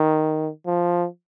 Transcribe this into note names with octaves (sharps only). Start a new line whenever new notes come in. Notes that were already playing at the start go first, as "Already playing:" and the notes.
Already playing: D#3
F3